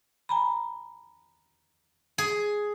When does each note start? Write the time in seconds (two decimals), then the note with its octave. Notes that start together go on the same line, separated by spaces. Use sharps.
0.29 G#5 A#5 B5
2.18 G#4